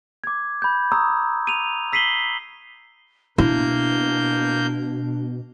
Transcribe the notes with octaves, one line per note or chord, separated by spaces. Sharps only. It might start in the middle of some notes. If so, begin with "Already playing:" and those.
D6 G#6
B5 G6
A#5 C#6 D#6 E6
D#7 F7
E6 B6 C7 D#7 F#7 G7
B2 A#3 D4 E4 G6